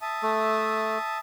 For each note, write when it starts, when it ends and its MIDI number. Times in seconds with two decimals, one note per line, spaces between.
0.02 1.18 76
0.02 1.18 81
0.02 1.18 87
0.22 0.98 57